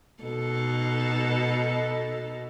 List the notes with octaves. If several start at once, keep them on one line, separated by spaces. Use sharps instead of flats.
B2 D#4 A4